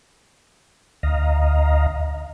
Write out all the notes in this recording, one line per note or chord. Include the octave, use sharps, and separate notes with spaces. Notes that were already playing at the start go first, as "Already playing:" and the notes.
D2 D#5 F5 A#5